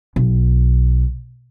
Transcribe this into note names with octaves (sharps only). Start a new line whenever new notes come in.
B1